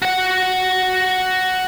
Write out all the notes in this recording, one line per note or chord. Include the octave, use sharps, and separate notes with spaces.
F#4 F#5